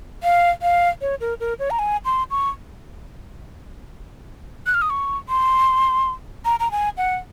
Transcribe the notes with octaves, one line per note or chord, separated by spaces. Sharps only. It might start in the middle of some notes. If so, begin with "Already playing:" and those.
F5
F5
C#5
A#4
A#4
C#5
A#5
G#5
C6
C#6
F#6
F6
D#6
C#6
C6
A#5
A#5
G#5
F#5